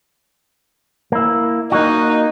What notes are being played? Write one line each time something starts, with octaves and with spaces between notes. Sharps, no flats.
A#3 E4
A#3 D#4 F#4